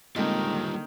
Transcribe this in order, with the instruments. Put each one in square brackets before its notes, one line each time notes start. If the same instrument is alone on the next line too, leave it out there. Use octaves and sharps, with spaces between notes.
[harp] D3 A#3 C4 [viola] D#3 [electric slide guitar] G3 F4 G4 [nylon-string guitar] G#3